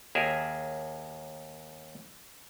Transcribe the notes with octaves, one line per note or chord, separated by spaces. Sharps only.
D#2 G#4 A#4 E5